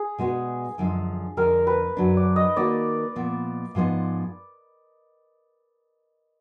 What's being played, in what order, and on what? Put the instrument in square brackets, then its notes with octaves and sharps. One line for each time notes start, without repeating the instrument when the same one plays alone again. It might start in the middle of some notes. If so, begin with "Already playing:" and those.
Already playing: [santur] G#4
[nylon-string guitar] B2 G#3 D4 F#4 B4
F#2 D3 F3 G#3
[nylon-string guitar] F2 D3 G#3 [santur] A#4
[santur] B4
[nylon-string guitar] F#2 D3 F#3 D4
[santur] D5
D#5
[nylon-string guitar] D#3 A#3 D#4 F#4 [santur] D5
[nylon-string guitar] A#2 F3 B3
G#2 F3 G#3 B3 D#4